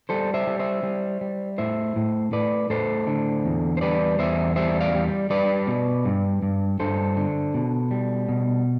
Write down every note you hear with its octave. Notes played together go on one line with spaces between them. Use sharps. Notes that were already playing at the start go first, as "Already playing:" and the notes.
G3 A4 C5
C5 E5
G3
C5 E5
G3
G3
A2 C5 E5
A2
A2 B4 D5
A2 A4 C5
D3
E2
C5
G3 B4 D5
E2 C5 E5
G3 C5 E5
D5 F5
G3
G3 B4 D5
B2
G2
G2
G2 A4 C5
D3
B2
G3
B2